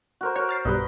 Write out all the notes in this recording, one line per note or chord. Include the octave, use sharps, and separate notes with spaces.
F#4 A#4 C5
F#4 A#4 C#5
F6 A6 C7
B1 G2 G3 B4 D#5